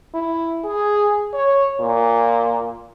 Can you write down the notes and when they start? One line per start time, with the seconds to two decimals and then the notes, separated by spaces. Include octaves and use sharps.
0.14 E4
0.65 G#4
1.34 C#5
1.80 A#2